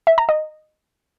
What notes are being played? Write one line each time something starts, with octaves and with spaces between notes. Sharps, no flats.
E5
A#5
D#5